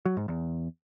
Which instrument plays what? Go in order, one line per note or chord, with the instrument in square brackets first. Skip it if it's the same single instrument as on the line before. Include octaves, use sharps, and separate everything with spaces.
[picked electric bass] F#3
G#2
E2